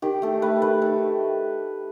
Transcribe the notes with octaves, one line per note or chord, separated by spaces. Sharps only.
D#3 G4
A3 A4
A3 B4
D#3 B4
D#3 A4